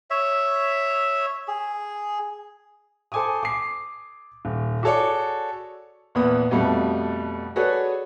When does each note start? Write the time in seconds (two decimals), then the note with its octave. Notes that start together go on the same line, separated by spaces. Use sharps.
0.10 C#5 E5
1.48 G#4
3.12 A4 C5 G#5 D6 D#6
3.43 D6 C7
4.45 D#1
4.83 F#4 G#4 A4 C#5 D5
6.15 A#1 E2 B3 B5 D#6
6.51 F2 B2 G3 A3
7.56 F#4 G#4 A4 B4 C#5 D5